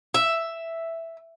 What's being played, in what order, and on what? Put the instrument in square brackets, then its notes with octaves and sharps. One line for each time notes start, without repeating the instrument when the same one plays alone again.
[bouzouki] E5